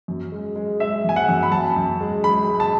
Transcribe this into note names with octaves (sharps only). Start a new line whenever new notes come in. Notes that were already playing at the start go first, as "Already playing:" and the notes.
F#2
G#3
G#3
G#3 E5
F#2 G#5
F#5
F#2
B5
F#2 A5
F#2
G#3
G#3 B5
G#3
A5